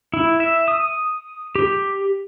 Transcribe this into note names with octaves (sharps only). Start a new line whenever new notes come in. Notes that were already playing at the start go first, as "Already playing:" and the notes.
E4
E5
D#6
G4